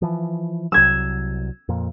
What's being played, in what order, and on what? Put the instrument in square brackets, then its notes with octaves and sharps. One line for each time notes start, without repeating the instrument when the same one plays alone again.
[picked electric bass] E3 F3
[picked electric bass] C2 F#3 [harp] E6 G#6
[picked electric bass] F2 A#2